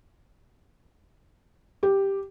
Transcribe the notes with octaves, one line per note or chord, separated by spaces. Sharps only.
G4